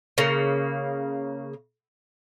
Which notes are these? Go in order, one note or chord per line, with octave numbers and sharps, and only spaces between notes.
C#3 A#3